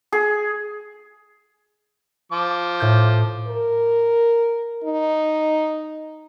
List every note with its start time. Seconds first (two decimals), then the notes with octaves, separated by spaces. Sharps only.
0.12 G#4
2.32 F3 D6
2.80 A2 G6
3.47 A#4
4.84 D#4